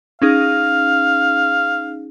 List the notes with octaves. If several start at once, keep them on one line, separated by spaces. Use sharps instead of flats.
C#4 D#4 G#4 F5